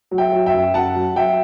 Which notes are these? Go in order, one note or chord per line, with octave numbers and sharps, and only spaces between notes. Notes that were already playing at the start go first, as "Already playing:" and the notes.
F#3
E5 G5
F#3
E5 G5
F#2
F#2 F#5 A5
F#3
F#3 E5 G5